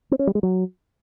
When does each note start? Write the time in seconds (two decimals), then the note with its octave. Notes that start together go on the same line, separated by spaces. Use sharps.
0.11 C4
0.19 C#4
0.27 G3
0.35 G#3
0.43 F#3